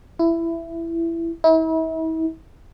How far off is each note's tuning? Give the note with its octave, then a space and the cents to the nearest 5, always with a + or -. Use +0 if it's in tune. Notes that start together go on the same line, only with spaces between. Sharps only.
E4 +15
E4 -40